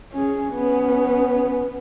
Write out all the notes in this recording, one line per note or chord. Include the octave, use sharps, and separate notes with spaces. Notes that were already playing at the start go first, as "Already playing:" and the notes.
C#4 G#4
B3 C#4